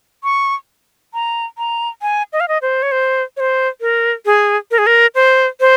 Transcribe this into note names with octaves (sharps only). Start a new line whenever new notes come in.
C#6
A#5
A#5
G#5
D#5
F5
D#5
C5
C#5
C5
C#5
C5
A#4
G#4
A#4
G#4
A#4
C5
C5